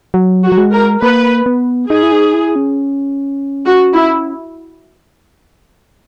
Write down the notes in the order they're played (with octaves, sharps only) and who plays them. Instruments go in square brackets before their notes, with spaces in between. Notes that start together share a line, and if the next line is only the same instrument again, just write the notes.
[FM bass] F#3
[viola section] F#4
[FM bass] F#3
G#3
[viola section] A#4
[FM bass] A#3 [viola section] B4
[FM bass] B3
[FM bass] D#4 [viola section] G#4
[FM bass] E4
D#4
E4
C#4
[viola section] F#4
E4